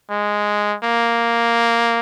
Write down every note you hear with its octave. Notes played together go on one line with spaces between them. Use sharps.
G#3
A#3